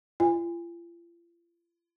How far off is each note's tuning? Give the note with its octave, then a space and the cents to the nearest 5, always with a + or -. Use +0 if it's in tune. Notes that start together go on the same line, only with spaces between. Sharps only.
F4 -40 G#5 -30